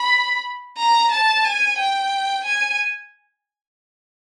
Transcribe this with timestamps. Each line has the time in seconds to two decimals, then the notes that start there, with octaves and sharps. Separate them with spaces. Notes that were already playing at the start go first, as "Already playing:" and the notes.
Already playing: B5
0.77 A#5
1.12 A5
1.44 G#5
1.79 G5
2.44 G#5